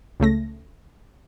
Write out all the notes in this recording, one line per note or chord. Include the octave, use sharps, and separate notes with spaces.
C#2 C#3 A3 A#6